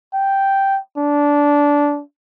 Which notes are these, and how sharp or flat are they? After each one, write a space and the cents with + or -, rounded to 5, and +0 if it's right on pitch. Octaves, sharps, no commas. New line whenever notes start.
G5 -5
D4 -15